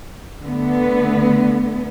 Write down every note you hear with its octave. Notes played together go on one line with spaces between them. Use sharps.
D3 A3 B3